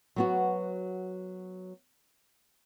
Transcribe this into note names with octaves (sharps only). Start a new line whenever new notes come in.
F#3 B3 F#4